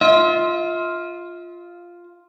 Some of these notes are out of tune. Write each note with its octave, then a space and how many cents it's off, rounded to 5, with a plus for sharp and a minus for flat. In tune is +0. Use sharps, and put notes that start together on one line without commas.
F4 +0 E5 -45